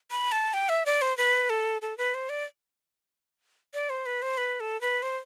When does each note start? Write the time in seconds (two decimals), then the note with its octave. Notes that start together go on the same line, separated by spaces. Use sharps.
0.11 B5
0.32 A5
0.53 G5
0.69 E5
0.86 D5
1.01 C5
1.17 B4
1.49 A4
1.82 A4
1.98 B4
2.14 C5
2.29 D5
3.74 D5
3.90 C5
4.06 B4
4.22 C5
4.37 B4
4.60 A4
4.81 B4
5.02 C5